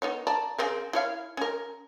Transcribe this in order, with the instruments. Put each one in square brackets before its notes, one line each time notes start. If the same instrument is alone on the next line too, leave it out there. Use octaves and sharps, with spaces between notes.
[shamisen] B3 D#4 C#5
D5 A5 A#5
C#3 C4 A#4
E4 C#5 F5
C#4 A#4